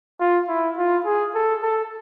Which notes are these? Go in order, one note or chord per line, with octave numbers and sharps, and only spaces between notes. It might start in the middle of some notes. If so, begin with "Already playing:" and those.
F4
E4
F4
G#4
A4
A4